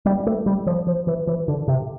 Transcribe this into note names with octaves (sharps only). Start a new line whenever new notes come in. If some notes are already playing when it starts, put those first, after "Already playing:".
G3
A3
G3
F3
F3
E3
E3
D3
C3